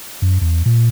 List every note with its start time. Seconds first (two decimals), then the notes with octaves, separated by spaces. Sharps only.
0.22 F#2
0.41 E2
0.66 A#2